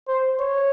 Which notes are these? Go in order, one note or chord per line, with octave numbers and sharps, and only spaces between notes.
C5
C#5